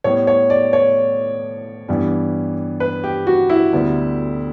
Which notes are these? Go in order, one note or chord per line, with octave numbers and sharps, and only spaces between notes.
A2 G3 B3 C#5
C#5
D5
C#5
G2 E3 G3 B3
B4
G4
F#4
E4
D2 D3 G3 B3